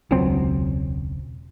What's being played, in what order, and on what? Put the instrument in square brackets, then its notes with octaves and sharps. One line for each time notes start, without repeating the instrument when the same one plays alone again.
[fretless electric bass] E1 C#2 F#3 C4